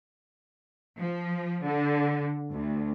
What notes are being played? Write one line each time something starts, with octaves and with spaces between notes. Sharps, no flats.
F3
D3
D2